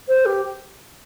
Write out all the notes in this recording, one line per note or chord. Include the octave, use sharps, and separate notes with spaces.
C5
G4